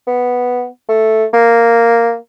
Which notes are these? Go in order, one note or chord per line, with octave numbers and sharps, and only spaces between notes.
B3
A3
A#3